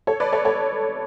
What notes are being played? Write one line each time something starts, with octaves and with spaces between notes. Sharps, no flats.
A4 C#5
B4 D5
A4 C#5
A4 C#5